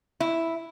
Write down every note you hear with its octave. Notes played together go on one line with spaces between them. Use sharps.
E4